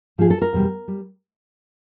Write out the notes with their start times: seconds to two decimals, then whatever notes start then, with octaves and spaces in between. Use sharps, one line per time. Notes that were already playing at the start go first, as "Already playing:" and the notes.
0.18 G#2 F3 G#4
0.30 A4
0.42 A#4
0.53 E2 B2 G3
0.88 G3